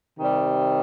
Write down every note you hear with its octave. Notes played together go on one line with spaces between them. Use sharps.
C3 D#3 G3